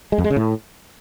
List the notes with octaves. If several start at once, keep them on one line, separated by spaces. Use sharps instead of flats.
G#3
F2
G#3
C#3
A2